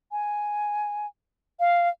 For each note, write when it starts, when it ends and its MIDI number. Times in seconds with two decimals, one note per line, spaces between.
0.12 1.07 80
1.60 1.89 77